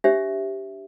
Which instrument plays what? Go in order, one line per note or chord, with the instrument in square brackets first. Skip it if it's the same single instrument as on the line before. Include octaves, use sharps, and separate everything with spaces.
[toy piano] D4 G4 C5 E5